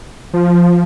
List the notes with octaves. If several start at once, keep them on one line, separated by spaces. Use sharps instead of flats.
F3